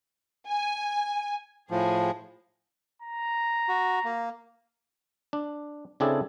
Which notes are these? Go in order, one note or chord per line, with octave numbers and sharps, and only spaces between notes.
G#5
A2 F3 G#4
A#5
F#4
A#3
D4
C#3 C4 D4 E4 G#4 A4